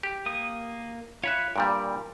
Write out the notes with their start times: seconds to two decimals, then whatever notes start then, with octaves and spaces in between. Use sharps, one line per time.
0.03 G4
0.26 A#3 D#6
1.24 F4 C#5 E5 B5 F#6
1.56 G2 A#2 G3 A#4